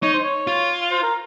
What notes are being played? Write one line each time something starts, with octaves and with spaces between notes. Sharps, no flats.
D#4 C#5
C5
C#5
F4
C5
A#4